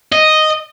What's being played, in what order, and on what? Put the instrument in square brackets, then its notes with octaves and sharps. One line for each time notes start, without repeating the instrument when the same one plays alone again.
[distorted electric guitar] D#5